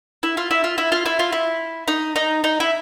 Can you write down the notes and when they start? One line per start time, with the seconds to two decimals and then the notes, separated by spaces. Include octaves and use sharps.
0.23 E4
0.37 F4
0.51 E4
0.64 F4
0.78 E4
0.92 F4
1.06 E4
1.19 F4
1.32 E4
1.88 D#4
2.16 D#4
2.44 D#4
2.60 E4